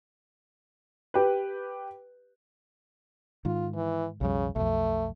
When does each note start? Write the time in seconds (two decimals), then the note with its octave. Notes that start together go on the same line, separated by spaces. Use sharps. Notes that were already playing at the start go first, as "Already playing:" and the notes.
1.14 G4 B4
3.45 G#2 D#3 F4
3.74 E3
4.21 B1 F2 C#3 G3
4.56 B1 F2 A3